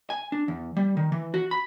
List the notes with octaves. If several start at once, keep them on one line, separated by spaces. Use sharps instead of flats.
G#5
D4
E2
G3
D#3
E3
F#4
B5